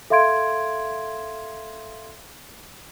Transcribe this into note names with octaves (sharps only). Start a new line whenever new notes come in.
A4 E5 F5 C6 G#6 D7